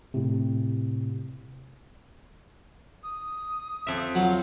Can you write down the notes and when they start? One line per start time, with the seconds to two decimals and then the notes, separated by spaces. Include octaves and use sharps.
0.14 A2 C3
3.04 D#6
3.87 F2 E5
4.15 F#3 F4